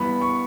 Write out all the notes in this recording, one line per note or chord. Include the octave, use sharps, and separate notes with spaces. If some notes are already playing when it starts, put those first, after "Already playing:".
Already playing: G2 E3 B3 B5
C#6